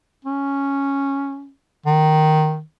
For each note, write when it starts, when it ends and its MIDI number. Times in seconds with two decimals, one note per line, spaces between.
0.25 1.51 61
1.86 2.61 51